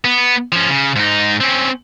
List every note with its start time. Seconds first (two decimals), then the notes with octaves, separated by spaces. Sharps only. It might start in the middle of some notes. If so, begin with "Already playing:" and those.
0.05 B3
0.52 F3 C#4
0.69 C#3
0.96 G#2 D#4
1.41 C4 C#4